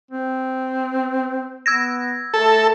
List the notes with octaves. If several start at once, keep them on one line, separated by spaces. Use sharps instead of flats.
C4
B3 E6 G#6 A#6
A3 A4